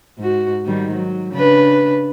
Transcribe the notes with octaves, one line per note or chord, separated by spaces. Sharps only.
G#2 F#4
G#2 D#3 G3
F#3
C#3 D4 B4